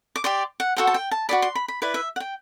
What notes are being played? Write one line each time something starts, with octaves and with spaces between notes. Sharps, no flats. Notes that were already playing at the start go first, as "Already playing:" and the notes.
D6
G4 D5 C6
F#5
F#4 A4 C5 F#5
A5
G5
A5
F#4 A4 D5 B5
C6
B5
B5
E4 B4 D5
E5
F#5
G5